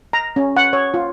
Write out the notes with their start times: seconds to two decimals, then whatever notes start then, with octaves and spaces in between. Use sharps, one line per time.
0.13 A#5
0.36 C#4
0.57 F#5
0.73 C#5
0.94 F4